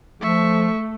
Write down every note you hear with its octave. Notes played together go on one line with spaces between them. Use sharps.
F3 A3 E5 C#6